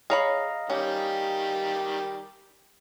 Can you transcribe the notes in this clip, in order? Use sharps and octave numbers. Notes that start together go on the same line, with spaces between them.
G#4 C#5 D#5 F5 A#5 B5
D#3 G3 C#4 G4